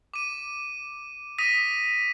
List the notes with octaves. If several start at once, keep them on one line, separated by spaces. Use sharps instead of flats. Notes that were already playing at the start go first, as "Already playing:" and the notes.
D6 D#7
D#6 A#6 B6 D#7